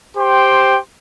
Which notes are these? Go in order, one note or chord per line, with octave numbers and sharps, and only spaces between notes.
G4 C5 G5 C6